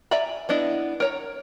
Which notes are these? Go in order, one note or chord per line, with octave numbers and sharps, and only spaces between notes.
D5 E5 G#5 A#5 B5
B3 D4 E4 D#5
A#4 C#5 A#5